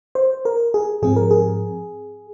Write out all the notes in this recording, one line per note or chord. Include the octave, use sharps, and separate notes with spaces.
C5
A#4
G#4
G#2 F3 C4 G#4
A#4
G#4